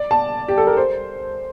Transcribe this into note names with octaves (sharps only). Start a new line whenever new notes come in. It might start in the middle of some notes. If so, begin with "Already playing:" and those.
Already playing: D5
A5
G4
A4
A#4
C5